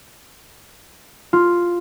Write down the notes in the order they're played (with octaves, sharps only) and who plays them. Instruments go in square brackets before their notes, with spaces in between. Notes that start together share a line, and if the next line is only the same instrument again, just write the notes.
[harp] F4